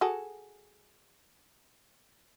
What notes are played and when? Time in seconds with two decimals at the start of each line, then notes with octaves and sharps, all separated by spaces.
0.01 F#4 G#4 A4